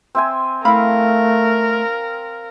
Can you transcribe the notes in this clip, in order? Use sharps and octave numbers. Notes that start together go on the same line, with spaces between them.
C4 E5 G#5 C6
A3 E4 A#4 F5 B5